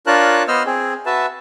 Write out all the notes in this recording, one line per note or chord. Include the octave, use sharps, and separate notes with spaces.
D4 F4 A#4 C#5 A5 F#6
B3 C5 D#5 E6 F6
C4 G#4
F#4 B4 E5 A5